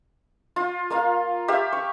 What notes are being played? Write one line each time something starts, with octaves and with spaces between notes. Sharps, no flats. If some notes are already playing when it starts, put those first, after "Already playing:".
F4
A#3 F4 F5
G4 E5 F5
C#6